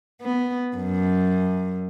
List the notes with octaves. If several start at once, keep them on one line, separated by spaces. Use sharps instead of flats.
B3
F#2